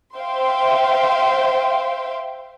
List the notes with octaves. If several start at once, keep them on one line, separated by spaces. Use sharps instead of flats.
C5 E5 F5 G5 C6